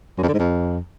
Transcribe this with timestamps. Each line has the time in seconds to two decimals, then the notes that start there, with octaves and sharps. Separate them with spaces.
0.18 F#2
0.23 F2
0.28 D3
0.34 G#2
0.39 F2